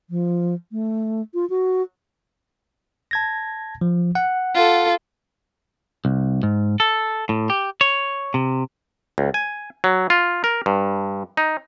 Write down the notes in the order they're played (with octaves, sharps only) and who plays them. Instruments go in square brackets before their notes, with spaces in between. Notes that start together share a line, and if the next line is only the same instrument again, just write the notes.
[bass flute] F3
A3
F4
F#4
[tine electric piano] A5 G#6 A#6
F3
F#5
[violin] F4 A4
[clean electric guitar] C2
G#2
A4
A2
G4
C#5
C3
[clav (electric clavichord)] C#2
G#5
F#3
F4
A#4
G2
D#4